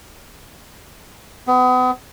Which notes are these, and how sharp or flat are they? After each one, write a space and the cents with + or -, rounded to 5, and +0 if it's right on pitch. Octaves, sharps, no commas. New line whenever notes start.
B3 +35